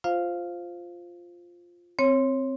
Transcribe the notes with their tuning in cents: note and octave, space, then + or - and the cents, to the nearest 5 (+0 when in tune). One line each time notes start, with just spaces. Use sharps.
F4 +0 C5 +0 F5 +0
C4 +0 C#5 -20